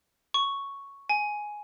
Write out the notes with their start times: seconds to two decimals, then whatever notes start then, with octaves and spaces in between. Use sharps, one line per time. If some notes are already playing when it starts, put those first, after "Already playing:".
0.34 C#6
1.10 G#5